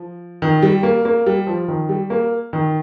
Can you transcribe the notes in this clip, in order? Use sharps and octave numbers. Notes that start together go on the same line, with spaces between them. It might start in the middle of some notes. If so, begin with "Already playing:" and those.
Already playing: F3
D#3
G3
A#3
A#3
G3
F3
D#3
G3
A#3
D#3